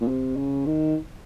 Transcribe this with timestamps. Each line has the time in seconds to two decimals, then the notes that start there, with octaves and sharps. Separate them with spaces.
0.01 A#2
0.08 C3
0.37 C#3
0.66 D#3